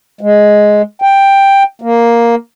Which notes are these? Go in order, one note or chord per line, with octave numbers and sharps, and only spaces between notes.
G#3
G5
A#3